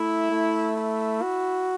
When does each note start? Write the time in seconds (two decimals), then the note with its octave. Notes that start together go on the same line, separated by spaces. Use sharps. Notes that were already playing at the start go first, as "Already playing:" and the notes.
Already playing: A3 E4
0.30 A3
0.77 E4
1.22 F#4